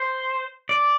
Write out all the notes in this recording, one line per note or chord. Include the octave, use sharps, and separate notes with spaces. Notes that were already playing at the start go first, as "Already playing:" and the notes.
Already playing: C5
D5